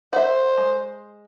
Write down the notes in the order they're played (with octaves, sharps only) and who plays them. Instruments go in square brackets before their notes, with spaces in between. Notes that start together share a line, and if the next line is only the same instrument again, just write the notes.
[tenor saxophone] C5 [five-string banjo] E5 F#5
[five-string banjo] G#3